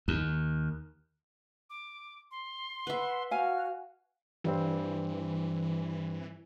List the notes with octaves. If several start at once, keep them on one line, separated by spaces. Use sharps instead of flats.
D#2
D6
C6
B4 E5 F#5
F#4 F5 G#5 F6
G2 E3 G3 C4